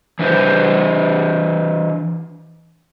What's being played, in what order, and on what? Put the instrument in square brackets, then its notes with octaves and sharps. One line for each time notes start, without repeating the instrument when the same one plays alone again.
[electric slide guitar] E3 D4 B4 C5